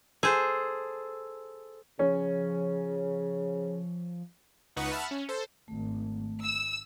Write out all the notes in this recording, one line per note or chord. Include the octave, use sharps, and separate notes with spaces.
G#4 A4 C5
C#3 F3 C#4
C#2 D#4 B4 F#5 C#6 D#6
E5 F#5 A5 B5 F6
C#4
A4 C5
G#1 A3
E6